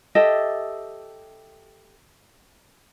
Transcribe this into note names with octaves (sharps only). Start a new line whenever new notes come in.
G4 A4 D#5 E5